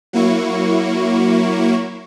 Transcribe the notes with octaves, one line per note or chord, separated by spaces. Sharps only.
F#3 A#3 E4 C#6